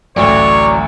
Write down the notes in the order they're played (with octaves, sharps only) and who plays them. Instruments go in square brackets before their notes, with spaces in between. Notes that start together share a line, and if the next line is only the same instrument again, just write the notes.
[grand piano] A1 D2 [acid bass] F#3 [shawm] C#5 [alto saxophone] D5